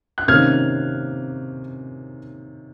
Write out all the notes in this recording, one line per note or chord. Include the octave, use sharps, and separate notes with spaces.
F#6
C3 D#3 A#3 C#4 F6 G#6